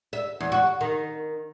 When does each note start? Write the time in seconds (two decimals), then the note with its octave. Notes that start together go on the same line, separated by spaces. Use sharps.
0.13 E5
0.40 E2
0.52 F#4
0.81 D#3